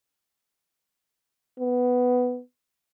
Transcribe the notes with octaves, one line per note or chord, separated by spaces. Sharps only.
B3